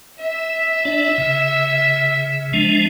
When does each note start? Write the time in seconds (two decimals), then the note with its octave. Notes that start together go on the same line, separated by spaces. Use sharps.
0.22 E5
0.85 D4 D5
1.18 C#3
2.53 F3 G#3 D4